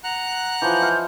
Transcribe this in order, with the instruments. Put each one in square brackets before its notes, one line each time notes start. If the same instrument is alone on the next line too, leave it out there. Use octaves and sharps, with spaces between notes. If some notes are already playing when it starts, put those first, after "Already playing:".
[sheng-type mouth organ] F#5 A#5 F#6
[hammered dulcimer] E3 F3 [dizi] G6
[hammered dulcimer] C5 F5